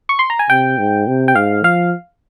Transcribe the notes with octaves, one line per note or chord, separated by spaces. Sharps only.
C#6
C6
A#5
G#5
C3 G5
G#2
C3
G5
G#2 F5
F3 F5